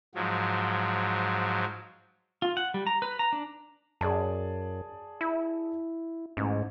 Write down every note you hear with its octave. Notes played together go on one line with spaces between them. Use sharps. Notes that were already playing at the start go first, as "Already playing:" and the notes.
G#2 F3 F#3
F4
F#5
G3
A#5
B4
A#5
D4
F#2 G#4 D5 A5
E4
A1 G#2